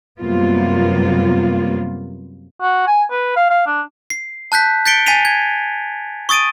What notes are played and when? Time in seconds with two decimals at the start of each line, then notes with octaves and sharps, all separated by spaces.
0.20 F#2 C3 G3 A#3 B3 F4
2.61 F#4
2.87 G#5
3.11 B4
3.36 F5
3.50 F5
3.66 D4
4.10 C7
4.52 A5 F#6 G6 B6
4.86 G6 A6 B6 C#7 D7 G7
5.06 G#5 A6 B6 C7 D#7 F7
5.25 G#6
6.29 C#6 D#6 A6 D7 D#7